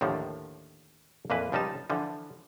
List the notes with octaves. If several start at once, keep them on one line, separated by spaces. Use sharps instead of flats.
D#2 A2 D3 D#3 F3
F2 A#2 E3 A#3 B4
C#2 F3 G3 D#4 A5
D3 E3 F3